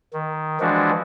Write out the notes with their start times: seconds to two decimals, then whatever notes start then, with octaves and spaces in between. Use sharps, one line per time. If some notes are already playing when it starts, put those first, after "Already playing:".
0.13 D#3
0.60 E3 F3 G#3 D4 F#4